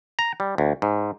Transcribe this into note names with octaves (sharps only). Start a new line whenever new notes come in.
A#5
G3
D2
G#2